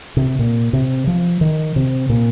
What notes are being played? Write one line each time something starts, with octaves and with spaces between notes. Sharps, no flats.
C3
A#2
C3
F3
D#3
C3
A#2